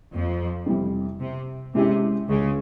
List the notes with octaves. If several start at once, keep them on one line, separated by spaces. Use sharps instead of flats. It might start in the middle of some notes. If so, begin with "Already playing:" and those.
F2 F3
F2 C3 E3 G3
C3
C3 G#3 C#4 E4 G4
C#2 C#3